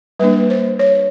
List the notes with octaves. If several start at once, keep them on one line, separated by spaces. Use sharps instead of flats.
G3 A#3 D4 B4
C5
C#5